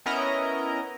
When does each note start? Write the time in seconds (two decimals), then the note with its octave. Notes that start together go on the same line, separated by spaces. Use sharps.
0.06 B3 C#4 E4 A#4 D#5 A#5